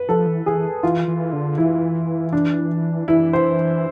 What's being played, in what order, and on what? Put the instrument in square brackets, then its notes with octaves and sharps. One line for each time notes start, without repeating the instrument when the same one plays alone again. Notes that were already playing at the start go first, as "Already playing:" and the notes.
Already playing: [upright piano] B4
[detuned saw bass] F3 [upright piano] A4
[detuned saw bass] E3
[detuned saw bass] E3 [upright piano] G#4
[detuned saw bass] E3 [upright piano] F4
[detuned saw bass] E3
D3
[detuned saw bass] E3 [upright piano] E4
[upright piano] D4
[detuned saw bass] E3 [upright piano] E4
[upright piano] C5